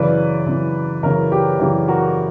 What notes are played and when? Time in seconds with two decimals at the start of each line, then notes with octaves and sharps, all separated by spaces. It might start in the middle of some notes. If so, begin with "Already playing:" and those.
Already playing: F#2 C#3 E3 B4 D5
0.46 F#2 C#3 E3
1.03 F#2 C#3 E3 A#4 C#5
1.32 G4
1.60 F#2 C#3 E3 G4
1.88 F#4 A#4